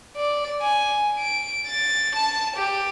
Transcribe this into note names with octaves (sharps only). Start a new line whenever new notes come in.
D5
G#5
D7
A6
A5
G4